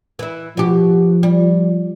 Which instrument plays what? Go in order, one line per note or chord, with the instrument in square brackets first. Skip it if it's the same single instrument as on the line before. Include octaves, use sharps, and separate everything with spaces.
[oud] E3 E4
[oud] B2 G4 [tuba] F3
[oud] G3